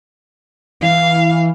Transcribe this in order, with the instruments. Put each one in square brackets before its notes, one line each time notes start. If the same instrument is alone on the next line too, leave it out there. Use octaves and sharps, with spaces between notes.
[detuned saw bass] E3 [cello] F5